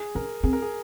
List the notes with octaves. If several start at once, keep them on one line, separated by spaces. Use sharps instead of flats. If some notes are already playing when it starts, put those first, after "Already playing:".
Already playing: G#4
C#4 A#4
C4 G#4
A#4
G#4